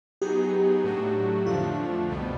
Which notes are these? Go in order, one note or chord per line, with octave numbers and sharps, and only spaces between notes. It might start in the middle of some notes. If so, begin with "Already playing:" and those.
F#3 B3 D#4 G4 G#4
A2 F#3 A3 D4 F#4
F2 D3 F3 A3 D4 F4
C2 B2 G3 B3